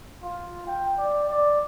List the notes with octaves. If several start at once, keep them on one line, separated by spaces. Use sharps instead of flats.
F4
G5
D5
D5